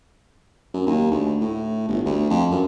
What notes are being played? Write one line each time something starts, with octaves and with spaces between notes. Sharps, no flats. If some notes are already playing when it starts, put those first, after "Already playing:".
F#2
D#2
D2
A2
G1
D2
F2
F#2